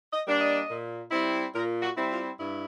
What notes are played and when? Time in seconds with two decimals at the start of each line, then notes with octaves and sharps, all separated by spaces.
0.13 D#5
0.27 G3 A#3 D4 D5
0.41 D#5
0.69 A#2
1.11 G3 C4 E4
1.54 A#2 A#4
1.82 F#4
1.96 G3 C4 E4
2.11 F4
2.39 G2 E4